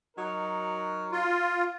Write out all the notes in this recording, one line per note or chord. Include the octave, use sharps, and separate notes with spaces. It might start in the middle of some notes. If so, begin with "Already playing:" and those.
F#3 D#4 A#4
F4